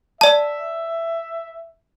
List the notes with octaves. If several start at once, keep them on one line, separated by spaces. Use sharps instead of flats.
D5 E5 A5